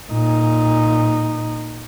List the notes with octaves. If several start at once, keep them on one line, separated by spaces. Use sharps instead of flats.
A#2 D#4